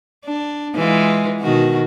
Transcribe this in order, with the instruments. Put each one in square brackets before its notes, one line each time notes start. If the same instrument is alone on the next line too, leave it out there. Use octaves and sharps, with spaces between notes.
[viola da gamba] D4
E3 G#3 F4
B2 D#3 F#4